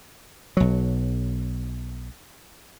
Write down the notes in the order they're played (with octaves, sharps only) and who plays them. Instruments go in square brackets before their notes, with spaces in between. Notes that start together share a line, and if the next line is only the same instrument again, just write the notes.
[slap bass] B1 F#3